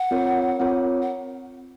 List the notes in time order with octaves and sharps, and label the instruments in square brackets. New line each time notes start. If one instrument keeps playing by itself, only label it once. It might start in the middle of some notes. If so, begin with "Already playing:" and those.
Already playing: [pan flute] F#5
[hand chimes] C4 F4 A#4 C#5
C4 F4 A#4 C#5
[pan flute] F#5